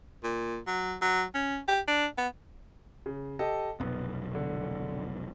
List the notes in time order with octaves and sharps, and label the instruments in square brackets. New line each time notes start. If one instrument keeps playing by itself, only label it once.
[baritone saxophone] A#2
F#3
F#3
C#4
G4
D4
B3
[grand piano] C#3
G4 A4 D#5
[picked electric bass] F1 B1 [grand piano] B3
[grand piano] D3